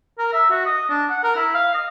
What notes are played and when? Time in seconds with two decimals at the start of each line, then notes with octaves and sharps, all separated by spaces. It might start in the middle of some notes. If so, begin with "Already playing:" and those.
0.18 A#4
0.33 E5
0.50 F#4
0.65 D#5
0.89 D4
1.10 F#5
1.23 A#4
1.36 E4
1.54 F5
1.74 D#5